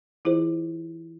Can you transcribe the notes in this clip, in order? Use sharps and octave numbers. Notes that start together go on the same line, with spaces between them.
E3 E4 F4 G#4 C5